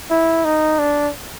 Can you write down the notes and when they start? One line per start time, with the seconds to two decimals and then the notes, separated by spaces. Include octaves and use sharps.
0.11 E4
0.45 D#4
0.79 D4